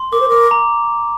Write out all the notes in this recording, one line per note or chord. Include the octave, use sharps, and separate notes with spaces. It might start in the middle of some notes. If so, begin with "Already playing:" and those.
Already playing: C6
A#4 D6
C5
A#4 D6
A#5